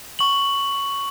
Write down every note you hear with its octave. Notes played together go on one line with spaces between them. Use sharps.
C#6 F#7